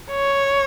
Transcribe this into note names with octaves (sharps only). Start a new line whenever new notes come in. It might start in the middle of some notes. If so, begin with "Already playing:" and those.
C#5